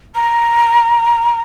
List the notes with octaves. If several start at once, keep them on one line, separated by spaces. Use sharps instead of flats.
A#5